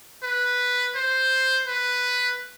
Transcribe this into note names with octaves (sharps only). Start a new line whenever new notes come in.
B4
C5
B4